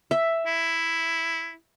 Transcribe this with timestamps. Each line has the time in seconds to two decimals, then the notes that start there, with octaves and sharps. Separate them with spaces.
0.11 E5
0.46 E4